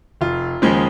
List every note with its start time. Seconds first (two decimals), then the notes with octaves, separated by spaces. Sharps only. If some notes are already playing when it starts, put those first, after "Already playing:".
0.21 F1 F4
0.62 D#2 C#3 F3 G#3